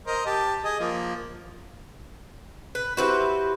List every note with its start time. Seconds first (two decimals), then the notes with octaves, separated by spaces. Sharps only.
0.07 A#4 C5 D#5
0.26 G4 A5
0.65 G#4 D#5
0.80 F3 A#3
2.75 B4
2.97 C4 E4 F#4 G4 B4 C5